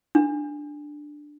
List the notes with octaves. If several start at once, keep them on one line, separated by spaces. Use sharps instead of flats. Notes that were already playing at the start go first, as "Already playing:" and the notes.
D4